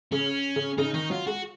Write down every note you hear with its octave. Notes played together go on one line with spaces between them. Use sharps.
C#3 C#4
C#3
C#3 D#4
D#3 D#4
F#3 F4
G#3 F#4